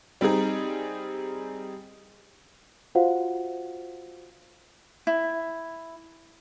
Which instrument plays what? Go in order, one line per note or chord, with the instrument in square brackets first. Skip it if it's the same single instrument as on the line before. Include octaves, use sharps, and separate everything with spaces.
[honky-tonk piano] G3 C4 D#4 G#4
[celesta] F4 F#4 C5 F5 F#5
[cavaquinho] E4